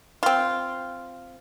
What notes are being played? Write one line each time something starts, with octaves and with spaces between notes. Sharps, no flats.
C4 F4